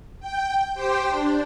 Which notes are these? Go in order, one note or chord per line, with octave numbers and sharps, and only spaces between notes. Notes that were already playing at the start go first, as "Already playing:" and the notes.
G5
G4 C5 G5
D4